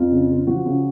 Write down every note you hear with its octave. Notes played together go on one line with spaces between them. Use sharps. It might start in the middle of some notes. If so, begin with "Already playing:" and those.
Already playing: F2 F4
C#3
C#3
F3 F#4
C#3